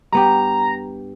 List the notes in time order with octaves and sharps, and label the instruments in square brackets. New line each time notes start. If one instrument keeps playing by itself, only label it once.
[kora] G2 B3 G4 [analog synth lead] A#5